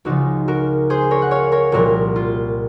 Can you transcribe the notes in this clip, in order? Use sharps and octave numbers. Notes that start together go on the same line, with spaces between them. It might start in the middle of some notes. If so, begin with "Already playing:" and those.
C#2 C#3 F3 D#4 F#4
F#4 A#4
G#4 C5
A#4 C#5
F#5
C#5 F5
A#4 C#5
C2 A#2 F3 F#4 A#4
F4